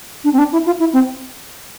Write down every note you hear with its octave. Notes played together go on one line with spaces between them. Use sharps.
D4
C4
D4
E4
F4
E4
C4